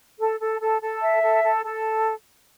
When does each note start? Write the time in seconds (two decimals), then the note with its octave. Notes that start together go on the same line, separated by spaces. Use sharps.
0.19 A4
0.40 A4
0.60 A4
0.81 A4
1.02 E5
1.22 A4
1.44 A4
1.64 A4